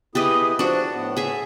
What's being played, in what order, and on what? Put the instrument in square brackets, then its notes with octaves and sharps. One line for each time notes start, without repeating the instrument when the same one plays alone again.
[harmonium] B3 E4 G#4 [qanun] G4 B4 D#5
[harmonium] F3 [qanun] D4 F#4
[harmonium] A2 B3 F#5
[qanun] G#4 E5